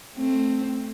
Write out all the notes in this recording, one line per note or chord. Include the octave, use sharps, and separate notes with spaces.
A3 C4